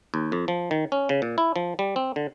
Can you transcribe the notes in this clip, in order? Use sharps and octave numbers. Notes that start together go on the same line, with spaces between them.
D#2
F2
F3
D#3
C#4
C#3
A#2
E4
F3
G3
C4
D3